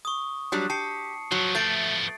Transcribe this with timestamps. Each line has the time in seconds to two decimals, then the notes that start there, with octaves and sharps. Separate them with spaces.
0.05 C#6 D#6
0.52 F#3 G3 D4
0.70 G4 A5 C7 C#7
1.32 F3 F#3 B3 C7
1.55 A3 A6 C7 D7